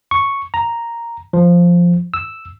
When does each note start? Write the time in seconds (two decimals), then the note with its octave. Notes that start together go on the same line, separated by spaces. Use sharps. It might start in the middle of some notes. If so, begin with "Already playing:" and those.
0.11 C#6
0.54 A#5
1.33 F3
2.14 E6